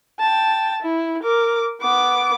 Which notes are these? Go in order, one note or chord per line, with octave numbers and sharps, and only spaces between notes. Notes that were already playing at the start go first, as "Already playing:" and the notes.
G5 A5
E4
A#4 D6
B3 D6